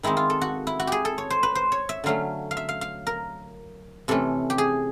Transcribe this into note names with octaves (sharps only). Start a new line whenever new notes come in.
D#3 G#3 C4 D#4 E4
F4
A4
F#4
E4
F#4
G4 G#4
A4
C#5
C5
B4
C5
C#5
E5
D3 F#3 A3 C#4 F5
F5
E5
F5
F5
A#4
C3 E3 A3 C#4 A4
G4
G#4